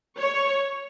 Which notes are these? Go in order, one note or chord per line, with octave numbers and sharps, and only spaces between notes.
C#5